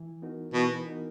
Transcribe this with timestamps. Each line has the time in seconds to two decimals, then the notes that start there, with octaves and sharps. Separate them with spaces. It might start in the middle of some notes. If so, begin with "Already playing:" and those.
Already playing: E3
0.22 B3 D#4 F#4 A#4
0.54 B2 E3
0.87 B3 D#4 F#4 A#4